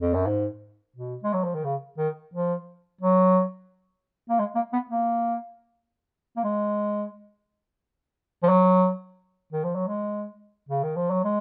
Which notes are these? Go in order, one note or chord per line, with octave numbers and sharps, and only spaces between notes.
F2
F#2
G#2
B2
G#3
F#3
F3
D#3
C#3
D#3
F3
F#3
A#3
G#3
A#3
B3
A#3
A#3
G#3
F3
F#3
D#3
F3
F#3
G#3
C#3
D#3
F3
F#3
G#3